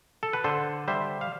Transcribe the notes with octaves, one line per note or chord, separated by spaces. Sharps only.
A4
B4
D3 A4 C5
G3 C5 E5
F5